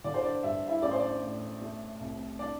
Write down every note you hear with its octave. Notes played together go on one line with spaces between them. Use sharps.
D3 D5
C5
D4 D5
G2 E5
E4 E5
A1 D5
C5
D4 D5
A2
A3
C2
D4 D5